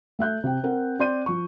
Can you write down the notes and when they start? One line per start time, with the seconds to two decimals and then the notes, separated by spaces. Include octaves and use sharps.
0.19 A3 E5 F#6 G6
0.44 C3 G5
0.64 C4 A#4 F#5
0.99 C4 D5 C6 G6 D#7
1.26 F3 C#6